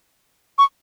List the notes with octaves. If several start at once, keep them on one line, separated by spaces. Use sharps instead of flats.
C#6